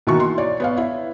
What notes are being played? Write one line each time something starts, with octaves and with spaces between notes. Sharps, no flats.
B2 D#3 E3 A#3 F#4 C#6
C6
C#5 D5
B3 C#5 F5
E4